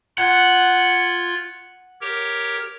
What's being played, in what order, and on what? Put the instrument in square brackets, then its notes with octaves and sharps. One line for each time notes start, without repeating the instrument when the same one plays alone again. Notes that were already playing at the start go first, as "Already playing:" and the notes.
[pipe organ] F4 G#6 [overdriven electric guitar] F#5
[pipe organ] G4 A#4 C#5